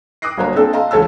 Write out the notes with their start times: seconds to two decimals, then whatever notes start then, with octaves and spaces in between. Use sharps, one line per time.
0.22 D6 D#6 F#6 A#6 C7
0.37 G1 F#3 A#3 C5 C#5 A#5
0.55 A#2 C4 D4 A4 E6
0.73 D#5 F5 A5 A#5 C6
0.91 E1 C#2 A4 C#5 A5 E6